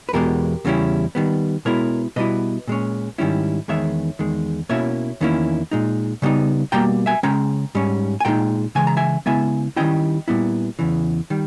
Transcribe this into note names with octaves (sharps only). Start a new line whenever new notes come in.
B4
E2 B2 G#3 G4 A#4
E2 C#3 G3 C#4 E4
D#3 G3 B3
B2 G#3 B3 E4 A#4 C#5
B2 G3 B3 E4 B4 D#5
A#2 G#3 C#4
G#2 D#3 G3 C#4 E4
E2 D#3 G#3 D#4 C#5 E5
E2 D#3 G#3
B2 A#3 C#4 E4 C#5 E5
E2 D#3 A#3 C#4 E4
A#2 G#3 D#4
C#3 G3 B3 D#4
B2 G3 A#3 G5 A#5
E5 G#5
C#3 G#3 C#4 G5 A#5
G#2 G3 C#4
G#5
A#2 G#3 D#4 G5 A#5
C#3 E3 G#3 G#5
A#5
E5 G#5
C#3 G#3 B3 E4 E5 G#5
D#3 G3 C#4 E4 D#5 G5
A#2 G3 B3 E4
E2 C#3 E3
D#3 G3